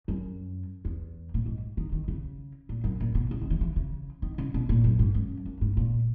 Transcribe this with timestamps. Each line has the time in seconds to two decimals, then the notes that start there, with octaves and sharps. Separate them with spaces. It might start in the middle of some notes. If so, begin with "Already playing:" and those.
0.08 F#2
0.85 E2
1.34 A#2
1.46 G#2
1.77 D#3
1.92 D#3
2.08 C#3
2.69 A#2
2.84 F#2
3.00 A#2
3.15 B2
3.31 C#3
3.41 D#3
3.50 E3
3.61 E3
3.76 C#3
4.22 D#3
4.38 C#3
4.54 B2
4.69 A#2
4.84 F#2
4.99 G#2
5.15 F#2
5.46 F#2
5.61 G#2
5.77 A#2